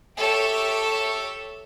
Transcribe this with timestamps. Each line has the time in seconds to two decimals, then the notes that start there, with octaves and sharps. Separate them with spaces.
0.18 G4 A4 C#5 E5